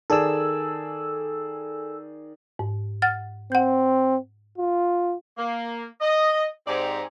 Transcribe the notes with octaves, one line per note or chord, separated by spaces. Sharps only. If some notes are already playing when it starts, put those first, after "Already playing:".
D#3 G#4 A4 D5 G#5 E6
G#2
F#5 F6 A6
C4 F#5 G6
F4
A#3
D#5
G#2 C4 G4 D5 G#5 A#5